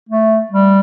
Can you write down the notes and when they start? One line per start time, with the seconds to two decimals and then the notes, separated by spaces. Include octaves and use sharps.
0.09 A3
0.52 G3